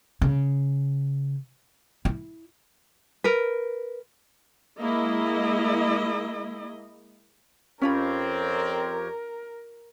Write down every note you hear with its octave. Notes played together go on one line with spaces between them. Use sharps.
C#3
E4
A#4 B4
G#3 A#3 E4 D#5
F2 C4 C#4 F4 G4 A#4 C#5 B5